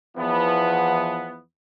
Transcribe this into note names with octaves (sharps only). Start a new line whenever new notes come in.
E2 E3 F3 B3